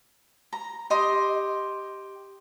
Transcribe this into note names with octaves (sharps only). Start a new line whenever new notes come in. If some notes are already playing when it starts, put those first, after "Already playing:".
A#5
G4 D#5 C6